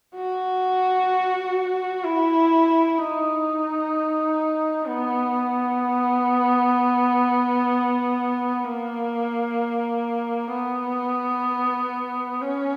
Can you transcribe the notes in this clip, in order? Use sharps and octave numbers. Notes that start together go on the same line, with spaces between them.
F#4
E4
D#4
B3
A#3
B3
C#4